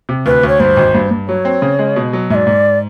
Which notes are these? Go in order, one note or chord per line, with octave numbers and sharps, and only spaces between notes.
C3
D2 B4
D2 C#5
G2 C5
G#1
G2
G2
F#3 C#5
C4
C#3
G#3
B2
F#3
G#2 D5 E5
G#2